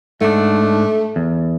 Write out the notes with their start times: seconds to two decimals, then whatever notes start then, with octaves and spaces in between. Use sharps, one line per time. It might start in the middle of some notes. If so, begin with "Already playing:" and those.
0.21 G#2 A3 D4
1.16 E2